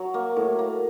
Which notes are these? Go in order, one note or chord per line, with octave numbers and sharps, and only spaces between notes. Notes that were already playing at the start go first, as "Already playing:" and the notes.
Already playing: F#3
A#3
A2
A#3